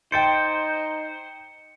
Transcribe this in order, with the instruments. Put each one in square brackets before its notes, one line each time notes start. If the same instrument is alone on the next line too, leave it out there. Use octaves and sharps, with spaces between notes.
[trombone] D#4 [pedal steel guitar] C5 [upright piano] G5 A6 D7 [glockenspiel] C#7